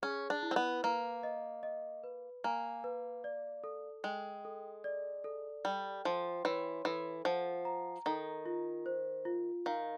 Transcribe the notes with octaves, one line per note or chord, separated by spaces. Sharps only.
C#4 G#4
D4
E4
C4
B3
A#3 B4
D#5
D#5
B4
A#3 G#5
B4
D5
A4
G#3 G5
A4
D5
A4
G3 G5
F3 C6
E3 C#5
E3 A4
F3 F#5
A#5
D#3 A4
F4
C5
F4
D#3 F5